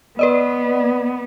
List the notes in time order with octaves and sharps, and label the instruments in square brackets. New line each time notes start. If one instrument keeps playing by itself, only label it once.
[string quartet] B3 [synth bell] B4 D5 D#5